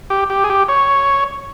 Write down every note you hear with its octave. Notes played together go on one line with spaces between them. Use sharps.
G4
G4
G#4
G4
C#5